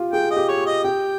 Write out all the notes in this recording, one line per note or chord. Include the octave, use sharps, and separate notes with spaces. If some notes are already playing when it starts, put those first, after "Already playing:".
Already playing: F4 G4
G#4 G5
D#5
G4
C#5
D#5
G4 G5